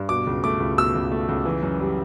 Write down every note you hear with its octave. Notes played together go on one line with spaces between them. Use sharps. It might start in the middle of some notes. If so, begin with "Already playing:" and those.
Already playing: G2
B2 D6
C#2
A3 D6
C#2
B2 E6
C#2
A3
C#2
E3
F#2
G3